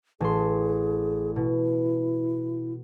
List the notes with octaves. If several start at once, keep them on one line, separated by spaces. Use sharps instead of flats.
A1 G#4 C6
B2 E4